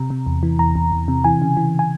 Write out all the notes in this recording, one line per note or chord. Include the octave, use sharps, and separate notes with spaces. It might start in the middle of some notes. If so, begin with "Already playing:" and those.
Already playing: C3 A#5
C3
E2
E3
E2 A#5
E2
E2
C3
E3 G#5
C#3
E3
G#5